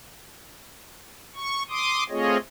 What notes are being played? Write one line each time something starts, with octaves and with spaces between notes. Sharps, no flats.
C#6
C6 D6 D#6
A3 C4 F4 G#4 C#5 D#5